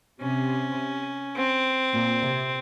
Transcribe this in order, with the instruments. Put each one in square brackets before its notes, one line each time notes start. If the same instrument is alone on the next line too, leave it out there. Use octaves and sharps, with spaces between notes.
[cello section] C3 [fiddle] C#4
[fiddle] C4
[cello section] A#2
C3